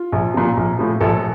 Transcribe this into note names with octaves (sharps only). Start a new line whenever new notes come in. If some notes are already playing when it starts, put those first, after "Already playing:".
Already playing: F4
A#1
A#2 F3
A#1
A2 F3
A#1 A4